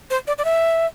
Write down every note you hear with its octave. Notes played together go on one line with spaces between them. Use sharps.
C5
D5
D5
E5